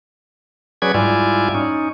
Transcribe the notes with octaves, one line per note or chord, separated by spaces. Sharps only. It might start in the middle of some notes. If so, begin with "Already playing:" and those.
F#3 C#4 G#4 B4 D5 G#6
G#2 G3 E4 F4 D5 G#5
C#4 D#4